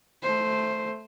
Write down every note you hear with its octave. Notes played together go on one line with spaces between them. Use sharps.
A3 C5